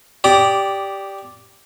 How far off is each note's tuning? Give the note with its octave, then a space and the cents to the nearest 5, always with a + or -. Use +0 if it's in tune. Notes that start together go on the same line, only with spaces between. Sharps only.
G4 +0 D5 -10 D#6 -15